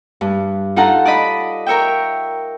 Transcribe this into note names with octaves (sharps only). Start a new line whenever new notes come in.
G2
D#4 F4 A4 F#5 A#5
D5 D#5 B5
A#4 C#5 E5 G5